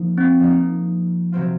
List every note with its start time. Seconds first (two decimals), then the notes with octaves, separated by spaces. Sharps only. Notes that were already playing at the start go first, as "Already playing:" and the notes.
Already playing: F3 A#3 D#4
0.18 C4
0.40 F3 A#3 D#4
1.32 C3 F#3 C4 F4